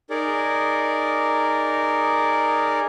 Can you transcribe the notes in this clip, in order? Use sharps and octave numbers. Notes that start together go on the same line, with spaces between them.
D#4 G#4 A#4 D5